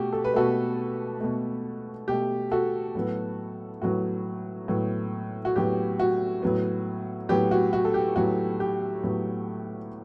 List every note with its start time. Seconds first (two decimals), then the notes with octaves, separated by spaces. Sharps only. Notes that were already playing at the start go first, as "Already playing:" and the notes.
Already playing: B2 A3 F#4 G4
0.13 A4
0.24 B4
0.34 B2 A3 F#4 A4
1.20 B2 A3
2.08 B2 A3 G4
2.51 F#4 A4
2.95 A2 F#3 B3
3.82 A2 F#3 B3 F#4
4.68 A2 F#3 B3
5.45 F#4
5.56 A2 F#3 B3 G4
6.00 F#4
6.42 A2 F#3 B3
7.29 A2 F#3 B3 G4
7.51 F#4
7.73 F#4
7.85 A4
7.94 G4
8.16 A2 F#3 B3 F#4
8.60 G4
9.03 A2 F#3 B3